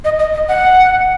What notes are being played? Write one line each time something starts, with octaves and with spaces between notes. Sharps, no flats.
D#5
D#5
D#5
F#5